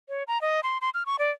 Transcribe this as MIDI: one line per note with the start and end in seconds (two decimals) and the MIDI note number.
0.09 0.23 73
0.28 0.41 82
0.41 0.60 75
0.63 0.78 84
0.81 0.90 84
0.94 1.03 89
1.06 1.16 85
1.19 1.31 74